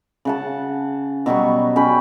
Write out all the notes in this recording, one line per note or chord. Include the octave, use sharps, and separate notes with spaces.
C#3 F#5 A5
B2 F#3 G3 C#6
C#4 B4 G5 B5